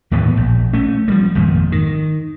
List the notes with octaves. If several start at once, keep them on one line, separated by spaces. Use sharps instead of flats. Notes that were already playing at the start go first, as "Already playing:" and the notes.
D#2 A2 E3 B3
A#1
A3 C#4
F3 G3 A3
G#1 F2 A#2
D#3